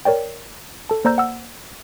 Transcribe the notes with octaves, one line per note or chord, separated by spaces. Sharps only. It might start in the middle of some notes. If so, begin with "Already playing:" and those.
A#4 C#5 D5 G5
A4 A5
A#3 C5 D5 A#5 E6 G6
F#5 E6